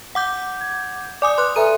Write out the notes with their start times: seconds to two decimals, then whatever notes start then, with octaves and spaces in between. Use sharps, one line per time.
0.15 F#5 D6 G6
0.61 G#6
1.22 D5 G#5 D6 D#6
1.38 B4 C6 F#6
1.56 A4 B4 E5 G#5 A#5 D#7